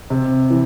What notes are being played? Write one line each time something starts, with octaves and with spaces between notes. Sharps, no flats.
C3
E3